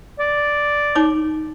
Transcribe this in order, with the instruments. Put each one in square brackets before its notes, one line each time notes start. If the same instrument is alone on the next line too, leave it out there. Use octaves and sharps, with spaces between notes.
[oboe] D5
[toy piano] D#4 C#5 D6